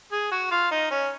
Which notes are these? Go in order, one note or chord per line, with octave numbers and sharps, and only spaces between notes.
G#4
F#4
F4
D#4
C#4